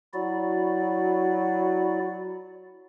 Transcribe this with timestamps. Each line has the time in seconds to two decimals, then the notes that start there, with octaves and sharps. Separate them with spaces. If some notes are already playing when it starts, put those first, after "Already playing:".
0.14 F#3 E4 F#4 D5